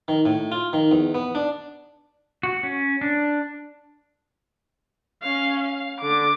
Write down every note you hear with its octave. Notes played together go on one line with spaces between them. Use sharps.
D#3
A2
F4
D#3
E2
B3
D4
F#4
C#4
D4
C#4 F5
F5
D3 D6